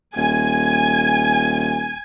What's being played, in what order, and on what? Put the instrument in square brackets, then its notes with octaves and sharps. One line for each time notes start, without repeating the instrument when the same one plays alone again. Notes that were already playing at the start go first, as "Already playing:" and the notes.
[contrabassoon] D#1 [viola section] G#5